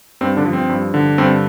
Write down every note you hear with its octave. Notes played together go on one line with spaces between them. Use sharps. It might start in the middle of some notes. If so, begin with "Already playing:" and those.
G2 C4
D3 D4
F3
C4
G2
D3
G2 C4